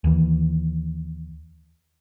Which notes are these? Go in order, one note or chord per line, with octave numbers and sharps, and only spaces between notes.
D#2 E3